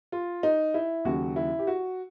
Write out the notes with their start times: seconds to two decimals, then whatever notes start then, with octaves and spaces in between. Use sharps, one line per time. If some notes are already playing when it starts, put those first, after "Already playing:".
0.12 F4
0.43 D#4
0.74 E4
1.05 D#2 C#3 F#3 F#4
1.36 E4
1.59 G4
1.67 F#4